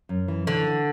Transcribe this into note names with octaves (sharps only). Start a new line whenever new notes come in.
F#2
E3
D3 E3
E3